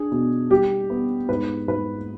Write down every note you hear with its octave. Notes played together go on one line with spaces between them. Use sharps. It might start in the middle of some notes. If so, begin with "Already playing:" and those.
Already playing: D4 G#4
B2
G3 G4
B3
G#2 B4
G#2 B4